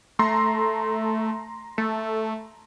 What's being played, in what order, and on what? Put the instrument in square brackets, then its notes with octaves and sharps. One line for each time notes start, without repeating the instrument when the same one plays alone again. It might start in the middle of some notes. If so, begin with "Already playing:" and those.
[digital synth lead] A3 [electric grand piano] A#5 C6
[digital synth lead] A3